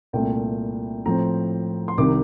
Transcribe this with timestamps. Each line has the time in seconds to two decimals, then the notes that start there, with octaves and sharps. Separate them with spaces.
0.13 C2 A#2 A3 G5
1.06 A2 F3 C4 A#5
1.88 C6
1.98 C2 C3 D#3 D6